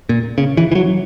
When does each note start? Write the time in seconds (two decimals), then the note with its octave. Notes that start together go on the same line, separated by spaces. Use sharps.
0.09 A#2
0.38 C#3
0.57 E3
0.72 E3
0.75 F#3